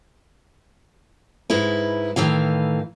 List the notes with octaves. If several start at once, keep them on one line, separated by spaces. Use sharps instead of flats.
G#2 G#3 E4 B4
A2 D#3 E3 F5